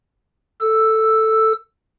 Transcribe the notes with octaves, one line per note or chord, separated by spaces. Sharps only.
A4 E6